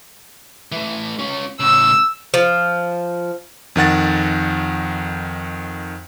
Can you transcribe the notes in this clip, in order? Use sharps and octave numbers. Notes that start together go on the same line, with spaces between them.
E3 A3
C#4 F4
A2 C#3 E6
F3
F2 D#3 F#5 A6